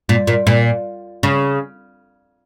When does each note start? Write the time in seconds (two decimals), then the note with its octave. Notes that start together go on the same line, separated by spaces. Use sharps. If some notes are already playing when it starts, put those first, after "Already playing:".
0.09 A#2
0.27 A#2
0.47 A#2
1.23 C#3